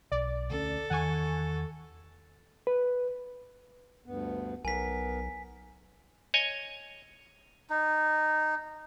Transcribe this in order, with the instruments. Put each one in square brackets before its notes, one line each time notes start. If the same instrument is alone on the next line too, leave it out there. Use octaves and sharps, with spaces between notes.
[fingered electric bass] B1 [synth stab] D5
[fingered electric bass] D2 C#4 [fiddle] A4
[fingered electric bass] E2 D#3 [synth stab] F#5 G#5 C#6
[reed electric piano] B4
[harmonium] D2 G2 B3
[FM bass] B1 [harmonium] B3 A#4 [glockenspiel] G#5 B6
[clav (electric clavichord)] C#5 D#5 G#5
[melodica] D#4